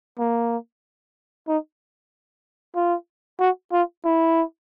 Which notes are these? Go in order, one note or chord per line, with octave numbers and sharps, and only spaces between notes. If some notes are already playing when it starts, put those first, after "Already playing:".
A#3
D#4
F4
F#4
F4
E4